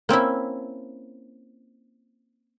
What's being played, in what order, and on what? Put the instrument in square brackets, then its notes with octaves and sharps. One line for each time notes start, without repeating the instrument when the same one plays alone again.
[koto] A#3 C4 C#4 E4